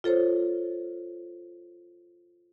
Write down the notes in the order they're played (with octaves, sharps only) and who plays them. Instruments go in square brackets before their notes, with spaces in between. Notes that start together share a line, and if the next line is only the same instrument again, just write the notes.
[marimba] F4 A4 C5 C#5